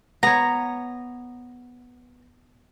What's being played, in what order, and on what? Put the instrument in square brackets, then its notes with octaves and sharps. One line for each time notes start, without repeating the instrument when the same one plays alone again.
[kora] B3 C#5 [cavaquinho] A#5